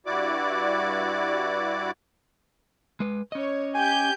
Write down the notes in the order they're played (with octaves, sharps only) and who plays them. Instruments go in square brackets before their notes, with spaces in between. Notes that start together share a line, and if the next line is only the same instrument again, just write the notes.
[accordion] G2 E4 F#4 D5 D6
[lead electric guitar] G#3 B4
[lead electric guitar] C#4 D#5 [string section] C#5
[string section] G4 G6 [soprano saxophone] G#5